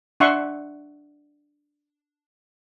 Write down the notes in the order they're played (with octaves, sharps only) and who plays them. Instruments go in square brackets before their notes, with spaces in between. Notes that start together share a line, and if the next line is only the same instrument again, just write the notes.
[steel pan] D4 E5 F#5 C6 C#6